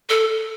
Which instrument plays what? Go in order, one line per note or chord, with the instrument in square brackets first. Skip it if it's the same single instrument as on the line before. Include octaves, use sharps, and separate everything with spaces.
[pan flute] A4